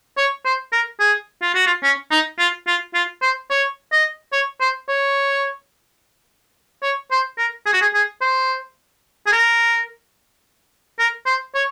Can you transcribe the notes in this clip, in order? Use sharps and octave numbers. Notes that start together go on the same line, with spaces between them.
C#5
C5
A#4
G#4
F4
F#4
F4
C#4
D#4
F4
F4
F4
C5
C#5
D#5
C#5
C5
C#5
C#5
C5
A#4
G#4
F#4
G#4
G#4
C5
G#4
A#4
A#4
C5
C#5